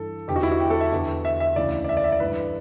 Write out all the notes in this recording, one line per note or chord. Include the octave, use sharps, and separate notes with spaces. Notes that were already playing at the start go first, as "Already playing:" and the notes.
Already playing: G2 E3 A4
E2 D3 G4
F#4
E4
F#4
G4
A4
E5
E2 D3
E5
E5
D2 C#3 E3 D5
D5
E5
D5
E5
D5
G2 E3 B4